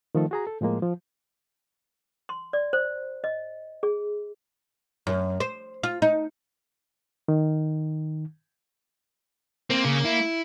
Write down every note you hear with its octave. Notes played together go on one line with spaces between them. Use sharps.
D#3 F3 A3 A4
F#4 G#4 A#5
A4
A2 F3 G#3 A#3
F3
C6
D5
C5
D#5
G#4
F#2
C5
F4
D#4
D#3
A#3 C4
C#3
E4